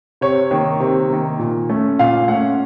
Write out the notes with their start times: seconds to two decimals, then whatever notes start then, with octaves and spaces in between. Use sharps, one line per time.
0.21 C3 C#5
0.51 D#3 A#3
0.80 C3
1.10 D#3 A#3
1.39 A#2
1.69 A3 C#4
1.99 A#2 F5
2.28 A3 C#4 F#5